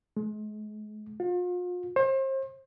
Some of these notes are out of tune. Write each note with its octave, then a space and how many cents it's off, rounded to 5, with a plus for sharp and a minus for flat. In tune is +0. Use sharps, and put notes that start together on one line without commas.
G#3 +40
F4 +40
C5 +35